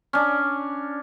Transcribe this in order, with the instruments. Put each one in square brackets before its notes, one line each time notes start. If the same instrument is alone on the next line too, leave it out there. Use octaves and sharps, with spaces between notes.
[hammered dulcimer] C#4 D4